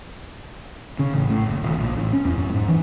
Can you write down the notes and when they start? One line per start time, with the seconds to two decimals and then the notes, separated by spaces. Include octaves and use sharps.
0.99 C#3
1.13 A1
1.30 A2
1.47 F#1
1.63 D#1
1.78 A#1
1.96 A1
2.13 C#4
2.25 E2
2.37 F#2
2.53 G#2
2.68 E3